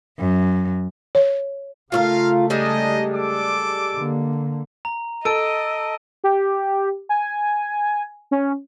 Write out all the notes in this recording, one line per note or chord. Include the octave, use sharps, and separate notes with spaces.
F#2
C#5
C#3 A3 F4 F#4 A#4 F5
G3 G#3 D4 D#4 D#5
A4 D6
D3 A#3
A#5
A4 D#5 E6 D7 D#7
G4
G#5
C#4